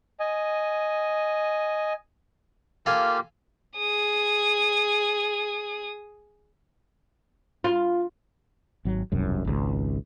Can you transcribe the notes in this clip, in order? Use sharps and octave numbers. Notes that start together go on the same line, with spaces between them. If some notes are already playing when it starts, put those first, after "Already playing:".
D#5 G#5
A#3 F4 G4 A4 F5 G#5
G#4 D#6
F4
G#1 F#3
E1 C2 F#2
G#1 C#2